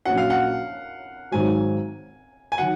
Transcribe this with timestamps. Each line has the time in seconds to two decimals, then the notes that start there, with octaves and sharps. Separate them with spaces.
0.05 A#1 A#2 F#3 C#4 F#4 F#5
0.17 F5
0.30 F#5
1.32 G#1 G#2 F#3 G#5
2.52 G#5
2.58 D#3 F#3 F#5